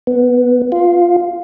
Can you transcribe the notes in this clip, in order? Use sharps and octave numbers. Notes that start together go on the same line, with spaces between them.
B3
F4